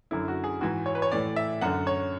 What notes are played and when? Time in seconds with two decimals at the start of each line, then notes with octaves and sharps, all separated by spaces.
0.11 F#2 D3 E4
0.28 F#4
0.44 G#4
0.61 G#2 E3 F#4
0.86 C#5
0.95 B4
1.02 C#5
1.12 A2 E3 D5
1.36 E5
1.61 F#2 D3 F#5
1.87 C#5